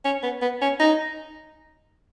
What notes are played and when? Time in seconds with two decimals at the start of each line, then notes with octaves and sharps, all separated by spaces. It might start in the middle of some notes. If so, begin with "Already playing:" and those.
0.05 C#4
0.23 B3
0.42 B3
0.61 C#4
0.80 D#4